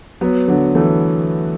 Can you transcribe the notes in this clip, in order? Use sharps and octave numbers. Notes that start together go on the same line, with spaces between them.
F#3 B3
D3 F#3
E3 A3